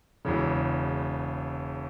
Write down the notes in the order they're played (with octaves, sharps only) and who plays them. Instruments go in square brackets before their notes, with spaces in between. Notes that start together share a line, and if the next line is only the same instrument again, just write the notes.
[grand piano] E1 E2 C#3